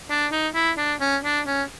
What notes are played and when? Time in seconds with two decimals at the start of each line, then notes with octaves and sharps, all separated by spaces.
0.10 D4
0.32 D#4
0.55 E4
0.78 D4
1.01 C#4
1.24 D4
1.47 C#4